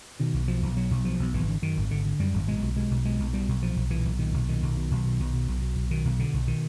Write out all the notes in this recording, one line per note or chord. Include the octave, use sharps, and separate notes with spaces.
B2 D#3
B1
B2 F3
B1
B2 F#3
B1
B2 F3
B1
G#1 E3
D3
F#2 D#3
G#1
G#1 D3
D3
F#2 G3
G#1
B2 G#3
B1
B2 G#3
B1
B2 G#3
B1
B2 G3
B1
A#2 F3
B1
A#2 E3
B1
A#2 D#3
B1
A#2 D#3
B1
B2
B1
B2
B1
B2
B1
B2
B1
B2 D#3
B1
B2 D3
B1
B2 D#3